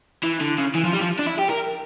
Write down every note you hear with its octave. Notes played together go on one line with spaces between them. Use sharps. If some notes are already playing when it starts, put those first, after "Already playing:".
E3
D3
C#3
E3
F3
G3
F3
D4
E4
G4
A#4